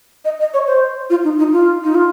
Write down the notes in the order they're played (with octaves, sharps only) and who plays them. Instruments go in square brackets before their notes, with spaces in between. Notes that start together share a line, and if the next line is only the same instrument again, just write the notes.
[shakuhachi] D#5
D#5
C#5
C5
F4
D#4
D#4
F4
D#4
F4